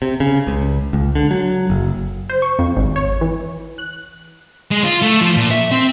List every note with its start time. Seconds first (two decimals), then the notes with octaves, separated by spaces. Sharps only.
0.02 C3
0.20 C#3
0.47 C#2
0.93 C#2
1.15 D3
1.31 F#3
1.70 F#1
2.30 C5
2.42 C#6
2.59 F2
2.77 G#1
2.96 C#5
3.21 E3
3.78 F#6
4.71 G#3
4.84 F4
5.02 A3
5.21 F3
5.37 A#2
5.51 E5
5.72 C4